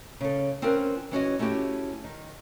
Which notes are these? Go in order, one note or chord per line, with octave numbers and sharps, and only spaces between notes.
C#3 A4
C4 C#4 F4 A#4 B4
E3 C#4 F#4 D#5
A3 C#4 E4 F#4 G4
D#3